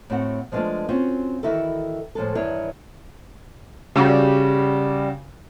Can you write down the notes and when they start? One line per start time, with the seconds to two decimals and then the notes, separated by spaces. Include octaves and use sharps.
0.10 A2 C4 F#4 F#5
0.52 F3 G#3 A3 B3 D4 F4
0.89 C4 C#4 F4 F#4
1.43 D#3 E3 E4 F#4 A4
2.15 A2 F3 G#3 A4
2.35 E2 G2 D#3 E4 C#5
3.96 C#3 G3 F#4